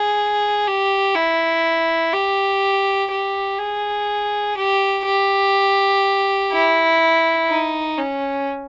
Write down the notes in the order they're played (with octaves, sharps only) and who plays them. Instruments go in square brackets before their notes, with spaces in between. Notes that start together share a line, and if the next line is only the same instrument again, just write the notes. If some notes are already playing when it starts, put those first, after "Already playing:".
Already playing: [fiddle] G#4
G4
E4
G4
G4
G#4
G4
G4
E4
D#4
C#4